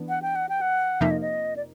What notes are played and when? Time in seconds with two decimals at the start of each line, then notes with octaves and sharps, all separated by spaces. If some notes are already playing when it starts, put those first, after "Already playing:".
Already playing: E3 B3 D4
0.09 F#5
0.22 G5
0.36 F#5
0.49 G5
0.61 F#5
1.01 F2 C3 F3 A#3 D#4 E5
1.11 D#5
1.21 D#5
1.56 D5